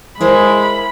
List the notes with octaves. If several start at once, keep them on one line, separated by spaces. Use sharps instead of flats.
G#3 E4 A#4 C5 B5